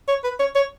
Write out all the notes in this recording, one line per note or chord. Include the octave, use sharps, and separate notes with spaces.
C#5
B4
C#5
C#5